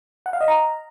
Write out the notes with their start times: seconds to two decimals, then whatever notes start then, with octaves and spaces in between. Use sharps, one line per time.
0.26 F#5
0.33 F5
0.41 D#5
0.48 A#5